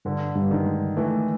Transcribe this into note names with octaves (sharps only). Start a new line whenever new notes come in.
G2 D3
G2
D#3
G#3
E3 A3